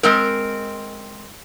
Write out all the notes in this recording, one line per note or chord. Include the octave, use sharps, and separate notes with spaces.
G#3 C4 A#4